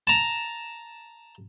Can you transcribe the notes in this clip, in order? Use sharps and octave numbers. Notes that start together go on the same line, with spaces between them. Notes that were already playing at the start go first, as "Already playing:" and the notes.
A5 A#5